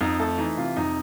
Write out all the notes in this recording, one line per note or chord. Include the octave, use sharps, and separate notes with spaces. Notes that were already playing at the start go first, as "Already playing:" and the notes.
F2 D#4
A3 A4
E3 D#4
C3 F4
F2 D#4